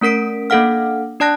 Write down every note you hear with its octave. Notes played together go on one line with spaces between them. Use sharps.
A3 C#4 A#4 B6 D7
A#3 D4 A4 F5 F#5 F6
D4 D5 A5 F#6 A#6